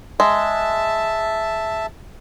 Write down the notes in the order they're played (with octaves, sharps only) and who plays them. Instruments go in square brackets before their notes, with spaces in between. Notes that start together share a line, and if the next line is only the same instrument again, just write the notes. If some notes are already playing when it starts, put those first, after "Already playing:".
[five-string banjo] G#3 [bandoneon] E5 A5